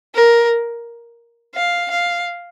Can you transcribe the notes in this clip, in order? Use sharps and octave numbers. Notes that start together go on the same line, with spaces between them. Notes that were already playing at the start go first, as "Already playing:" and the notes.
A#4
F5
F5